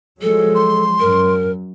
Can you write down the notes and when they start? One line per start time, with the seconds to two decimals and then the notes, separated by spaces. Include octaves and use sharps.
0.22 F3 F#3 G#3 A4
0.55 C6
1.00 F#2 A#4